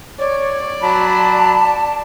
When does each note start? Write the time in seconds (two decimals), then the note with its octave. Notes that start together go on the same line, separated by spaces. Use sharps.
0.19 C#5 D5
0.82 F#3 A5 B5